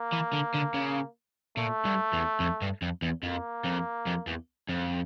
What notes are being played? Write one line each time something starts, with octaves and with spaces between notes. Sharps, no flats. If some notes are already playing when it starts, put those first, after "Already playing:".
Already playing: A#3
E3
D3
D3
C#3
A#2 A3
G2
E2
F2
G2
F2
E2
F2 A#3
F2
F2
E2
F2